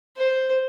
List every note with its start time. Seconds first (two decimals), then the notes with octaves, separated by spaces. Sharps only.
0.16 C5